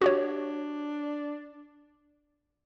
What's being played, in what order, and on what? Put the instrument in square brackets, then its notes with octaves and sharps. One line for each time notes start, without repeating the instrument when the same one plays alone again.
[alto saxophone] D4 [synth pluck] F#4 G4 C#5